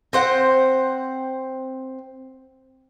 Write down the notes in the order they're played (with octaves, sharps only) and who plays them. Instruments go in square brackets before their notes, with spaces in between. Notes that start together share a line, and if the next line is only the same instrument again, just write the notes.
[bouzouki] C4 C5 F#5